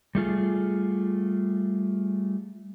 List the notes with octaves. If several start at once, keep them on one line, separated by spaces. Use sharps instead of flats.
G3 A3 F4 G#4